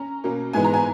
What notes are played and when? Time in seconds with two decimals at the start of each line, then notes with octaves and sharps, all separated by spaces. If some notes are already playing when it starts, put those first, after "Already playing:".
Already playing: C#4 A#5
0.24 B2 A#3 C#4
0.53 G#2 E3 G#3 B3 G#5
0.64 A#5
0.74 G#5